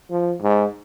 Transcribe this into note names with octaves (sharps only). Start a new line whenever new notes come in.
F3
G#2